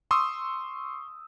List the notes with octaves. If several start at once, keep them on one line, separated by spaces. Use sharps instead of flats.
C6 C#6 D#6 E6